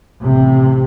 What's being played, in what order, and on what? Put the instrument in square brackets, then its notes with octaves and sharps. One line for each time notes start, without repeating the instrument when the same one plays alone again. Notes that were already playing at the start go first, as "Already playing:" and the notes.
[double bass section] A1 C3